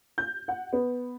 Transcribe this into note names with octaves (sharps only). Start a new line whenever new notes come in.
G6
F#5
B3